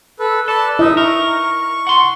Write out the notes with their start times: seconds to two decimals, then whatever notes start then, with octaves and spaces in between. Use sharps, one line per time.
0.19 A4 B4
0.48 A4 B4 D5 A5
0.79 D#4 E4 D#5 E5
0.97 A#4 C#6
1.87 F#5 C6